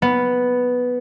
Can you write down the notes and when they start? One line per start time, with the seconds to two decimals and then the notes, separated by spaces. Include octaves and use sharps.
0.02 B3